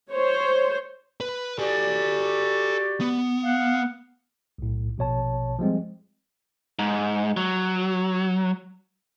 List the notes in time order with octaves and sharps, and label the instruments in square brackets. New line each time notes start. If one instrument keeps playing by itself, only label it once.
[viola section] C5 C#5
[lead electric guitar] B4
[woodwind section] F#4 G4 D5 [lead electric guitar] A4 G#5
[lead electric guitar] B3
[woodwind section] F5 F#5
[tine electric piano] B1 A2
A#1 B2 C#5 A5
F3 G3 G#3 C4
[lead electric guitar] G#2
F#3